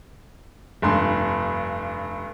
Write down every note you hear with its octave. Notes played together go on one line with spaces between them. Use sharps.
F1 G2 C6